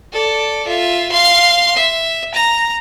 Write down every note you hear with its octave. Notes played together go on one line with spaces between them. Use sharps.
A4 D5
F4 E5
F5 C6
E5
A#5